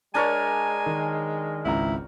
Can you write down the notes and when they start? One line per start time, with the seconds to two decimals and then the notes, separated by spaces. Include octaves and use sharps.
0.15 G#3 D4 A#4 C#5 G#5
0.86 D#3
1.65 G#1 C#2 E4 A#5